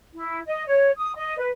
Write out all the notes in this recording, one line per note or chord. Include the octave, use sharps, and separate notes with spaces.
E4
D#5
C#5
D#6
D#5
B4